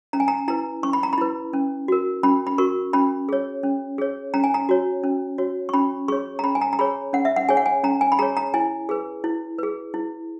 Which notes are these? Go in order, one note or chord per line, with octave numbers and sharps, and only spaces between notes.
C#4 A#5
G#5
A#5
E4 B4 A#5
C#4 C#6
B5
A#5
B5
E4 B4
C#4
F#4 A#4
C#4 B5
B5
F#4 A#4 C#6
C#4 B5
G#4 C#5
C#4
G#4 C#5
C#4 A#5
G#5
A#5
F#4 C#5
C#4
F#4 C#5
C#6
C#4 B5
G#4 C#5 C#6
A#5
C#4 B5
G#5
A#5
A#5
G#4 C#5 B5
C#4 F#5
E5
F#5
G#4 C#5 G#5
F#5
G#5
C#4 A#5
G#5
B5
G#4 C#5 A#5
A#5
E4 G#5
G#4 B4
E4
G#4 B4
E4